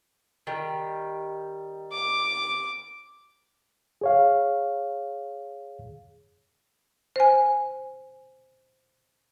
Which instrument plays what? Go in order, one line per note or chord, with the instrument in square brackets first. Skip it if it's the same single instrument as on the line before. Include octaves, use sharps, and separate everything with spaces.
[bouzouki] D#3 G3
[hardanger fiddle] D6
[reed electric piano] G#4 C#5 F5
[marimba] C5 G#5